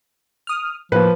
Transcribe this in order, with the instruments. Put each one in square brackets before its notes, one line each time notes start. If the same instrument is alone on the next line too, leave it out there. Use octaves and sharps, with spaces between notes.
[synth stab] D#6 F6
[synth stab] A2 A#3 [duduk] F3 [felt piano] B4